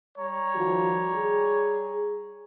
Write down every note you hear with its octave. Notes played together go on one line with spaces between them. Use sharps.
G3 C#5 A#5
D#3 F3 F#4
G#4